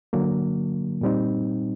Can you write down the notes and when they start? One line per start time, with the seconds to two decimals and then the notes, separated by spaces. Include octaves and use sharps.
0.13 D3 F#3 A#3
1.01 A#2 G3 C4 D#4